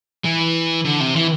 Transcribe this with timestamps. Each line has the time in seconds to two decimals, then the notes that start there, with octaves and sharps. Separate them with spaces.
0.25 E3
0.85 D3
1.00 C3
1.15 E3